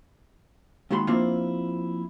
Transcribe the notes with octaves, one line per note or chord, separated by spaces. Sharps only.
D#2 D#3 G#3 F#4 B5 C6
F3 A#3 C4 D4 E4 F4